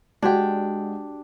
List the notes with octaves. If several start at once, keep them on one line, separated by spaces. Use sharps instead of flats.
G#3 D4 F#4 G4 D5 F#5